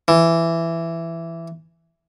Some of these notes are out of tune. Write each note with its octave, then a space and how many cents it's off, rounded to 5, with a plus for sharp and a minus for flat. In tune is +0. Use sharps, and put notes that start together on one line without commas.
E3 +10